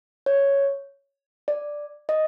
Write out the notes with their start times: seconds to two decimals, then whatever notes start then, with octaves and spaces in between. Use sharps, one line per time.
0.26 C#5
1.48 D5
2.09 D#5